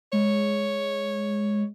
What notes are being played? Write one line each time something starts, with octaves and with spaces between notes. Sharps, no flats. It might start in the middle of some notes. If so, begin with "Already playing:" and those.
G#3 C#5